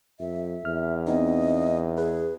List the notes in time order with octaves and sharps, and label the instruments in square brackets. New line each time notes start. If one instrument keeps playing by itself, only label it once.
[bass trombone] F2 [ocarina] E5
[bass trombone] E2 [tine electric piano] F6
[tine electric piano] B3 C4 D#4 [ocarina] D#5
[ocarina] G#4 [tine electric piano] B4